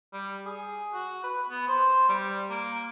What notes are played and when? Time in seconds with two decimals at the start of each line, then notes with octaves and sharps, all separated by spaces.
0.13 G3
0.46 G#4
0.93 F#4
1.24 B4
1.50 B3
1.68 C5
2.09 G3
2.50 A#3